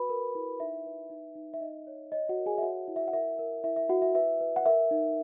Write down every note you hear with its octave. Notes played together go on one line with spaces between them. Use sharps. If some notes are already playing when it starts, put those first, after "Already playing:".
Already playing: F#4 B4 B5
A#4
E4
D#4 E5
B4
D#4
D#4
E5
D#4 D#5
C#5
C#5 D#5
F#4 F#5
A#4
G#4 G#5
E5
F#4 C#5 F#5
E4
E5
F#5
A#4 E5
A#4
E4 E5
E5
E4 F#4 F#5
E5
B4 E5
B4
F#5
A#4 E5
D#4